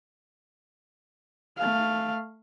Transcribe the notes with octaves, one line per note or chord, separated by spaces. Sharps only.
A3 F5